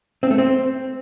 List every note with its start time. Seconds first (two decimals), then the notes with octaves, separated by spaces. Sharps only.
0.23 C4
0.31 A3
0.38 C4